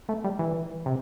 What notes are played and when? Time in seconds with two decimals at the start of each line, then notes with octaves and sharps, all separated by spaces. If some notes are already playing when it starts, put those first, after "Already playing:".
0.09 A3
0.24 G3
0.39 E3
0.86 C3